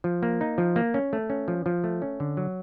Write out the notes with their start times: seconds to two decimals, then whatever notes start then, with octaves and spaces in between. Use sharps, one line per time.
0.04 F3
0.23 A#3
0.41 D#4
0.58 F3
0.76 A#3
0.94 C#4
1.13 A3
1.30 C#4
1.48 F3
1.66 F3
1.84 A3
2.02 C#4
2.20 D3
2.37 F#3